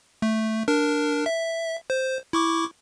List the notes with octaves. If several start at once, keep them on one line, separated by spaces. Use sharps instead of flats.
A3
D4 A#4
E5
C5
E4 C#6 D6